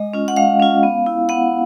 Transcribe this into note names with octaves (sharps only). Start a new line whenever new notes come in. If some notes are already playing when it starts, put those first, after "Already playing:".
Already playing: G#3 D#5
C#4 F4
F#5
G#3 F5
C#4 F4
B3
E4
B3 F#5